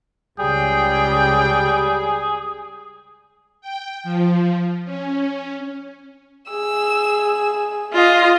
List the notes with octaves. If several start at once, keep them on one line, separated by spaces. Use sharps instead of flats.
C#2 C#3 G3 G#4 G5
G5
F3
C#4
G#4 E6
F4 D#5 F5